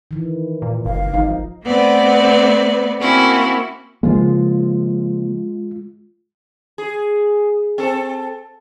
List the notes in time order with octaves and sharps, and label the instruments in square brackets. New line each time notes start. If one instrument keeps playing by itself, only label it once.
[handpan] D#3 E3
[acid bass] A#2
[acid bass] F#1 [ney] F5
[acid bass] G#1 [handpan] F3 D#4
[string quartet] A3 B3 C4 B4 D5
A#3 C4 C#4 E4 F#4
[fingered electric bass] C#3 F3 A#3 [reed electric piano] G#3 F4
[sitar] G#4
C4 A4